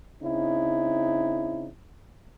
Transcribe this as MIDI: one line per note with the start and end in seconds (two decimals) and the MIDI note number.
0.22 1.67 49
0.22 1.67 60
0.22 1.67 63
0.22 1.67 64